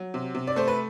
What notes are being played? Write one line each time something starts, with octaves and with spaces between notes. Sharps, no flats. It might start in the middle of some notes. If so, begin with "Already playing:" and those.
Already playing: F#3
C3
C3
D5
A3 C5
B4